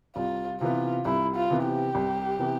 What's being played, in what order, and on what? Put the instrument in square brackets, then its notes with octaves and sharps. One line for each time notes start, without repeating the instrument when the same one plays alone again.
[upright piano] C2 [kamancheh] F4
[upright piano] C3 E3 B3 [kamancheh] F4
[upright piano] C2 [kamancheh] E4
[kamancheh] F4
[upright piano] C3 E3 B3
[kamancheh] G4
[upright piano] C2
C3 E3 B3